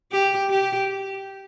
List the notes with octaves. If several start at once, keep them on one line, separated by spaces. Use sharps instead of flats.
G4
G4